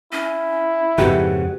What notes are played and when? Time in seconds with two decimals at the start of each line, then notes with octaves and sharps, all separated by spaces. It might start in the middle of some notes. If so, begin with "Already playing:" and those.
0.13 C#4 E4
0.98 F2 G#2 C#3 F#4 G4 B4 A#5